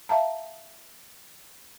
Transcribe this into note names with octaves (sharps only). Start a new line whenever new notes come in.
E5 F5 A5 A#5